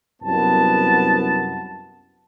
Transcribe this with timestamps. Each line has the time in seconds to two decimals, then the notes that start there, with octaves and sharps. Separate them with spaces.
0.22 C2 F#2 B3 A5